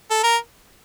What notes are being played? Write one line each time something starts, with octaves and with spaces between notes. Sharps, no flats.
A4
A#4